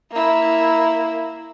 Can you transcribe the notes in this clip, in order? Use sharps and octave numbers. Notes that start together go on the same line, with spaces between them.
A#3 E4